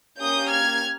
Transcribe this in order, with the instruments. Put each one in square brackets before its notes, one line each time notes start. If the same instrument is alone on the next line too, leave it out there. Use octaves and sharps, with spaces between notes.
[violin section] A#3 C#4 G4 D#6 G6
F6 G#6